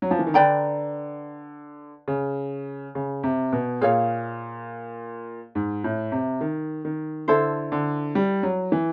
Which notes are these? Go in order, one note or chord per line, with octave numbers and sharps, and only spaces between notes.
F#3
F3
E3
D#3
D3 B4 D5 G5 A#5
C#3
C#3
C3
B2
A#2 G#4 C#5 F5
G#2
A2
C3
D#3
D#3
D3 E4 A4 C5
D3
G3
F#3
E3